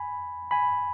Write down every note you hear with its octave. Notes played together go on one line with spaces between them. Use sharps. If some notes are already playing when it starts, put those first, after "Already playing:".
Already playing: G#5 B5
G#5 B5